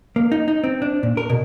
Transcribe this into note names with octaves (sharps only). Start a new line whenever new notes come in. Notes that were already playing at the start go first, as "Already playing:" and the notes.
A#3
D#4
D#4
C4
D4
A#2
A#4
B2